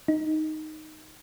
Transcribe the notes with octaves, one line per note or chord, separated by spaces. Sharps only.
D#4